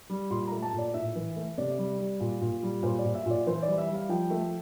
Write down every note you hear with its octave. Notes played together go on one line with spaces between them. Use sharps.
G3
A#2 C6
A3 A#5
A5
A#2
D5
A2 E5
E3
A3
C3 D5
G3
G3
A#2
A#2
G3
A#2 C5
D5
A#2
E5
A#2 D5
E3 C5
D5
G3
E5
G3
F5
F3 G5
A3